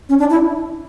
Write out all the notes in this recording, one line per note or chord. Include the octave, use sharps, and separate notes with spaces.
C#4
D4
E4